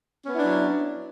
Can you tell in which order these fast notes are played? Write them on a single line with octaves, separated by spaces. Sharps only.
C#4 B3 E4 D4 F#3